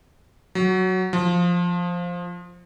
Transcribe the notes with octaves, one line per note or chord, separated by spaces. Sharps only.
F#3
F3